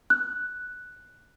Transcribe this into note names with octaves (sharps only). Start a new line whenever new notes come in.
F#6